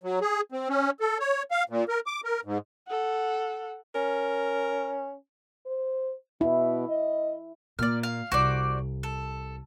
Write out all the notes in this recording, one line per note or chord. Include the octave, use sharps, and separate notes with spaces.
F#3
G#4
C4
C#4
A4
C#5
F5
A#2
A#4
D6
A#4
G#2
A4 F#5
C#4 A#4
C5
B2 E4
D#5
A#2 D5 F6
F5
C2 F#4 C5 D5
A4